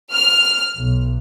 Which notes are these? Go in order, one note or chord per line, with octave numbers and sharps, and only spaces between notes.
F6
B1